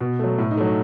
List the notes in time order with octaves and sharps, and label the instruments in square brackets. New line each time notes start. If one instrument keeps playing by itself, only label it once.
[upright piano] B2
F#3 A3
A2
D#4
F#3 A3